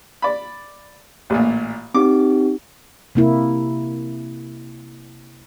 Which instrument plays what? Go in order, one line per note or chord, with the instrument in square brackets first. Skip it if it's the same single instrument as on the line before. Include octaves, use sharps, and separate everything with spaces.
[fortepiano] D5 B5
A1 A#2
[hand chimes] C4 D#4 G4 [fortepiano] D6
[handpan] C3 A#3 E4